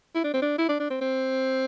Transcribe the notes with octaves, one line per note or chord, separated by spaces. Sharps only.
E4
D4
C4
D4
E4
D4
D4
C4
C4